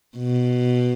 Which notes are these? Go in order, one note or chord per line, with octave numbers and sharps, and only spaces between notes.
B2